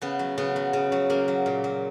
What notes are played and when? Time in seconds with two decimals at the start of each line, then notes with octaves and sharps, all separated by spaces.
0.02 C#3 B3
0.19 F#3
0.38 C#3 B3
0.56 F#3
0.73 C#3
0.92 F#3
1.10 C#3 A#3
1.28 F#3
1.46 A#2
1.64 F#3